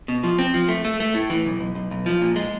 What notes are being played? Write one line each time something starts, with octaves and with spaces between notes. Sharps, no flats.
B2
F3
C4
F3
A3
A3
A3
A2
E3
B1
B1
B1
B1
F3
A#2
G#3